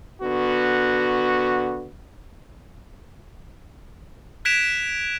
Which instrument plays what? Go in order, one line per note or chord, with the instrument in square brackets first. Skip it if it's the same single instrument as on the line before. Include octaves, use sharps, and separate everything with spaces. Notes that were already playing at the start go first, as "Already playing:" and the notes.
[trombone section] D3 B3 F#4
[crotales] F#6 G#6 B6 D7 E7 F7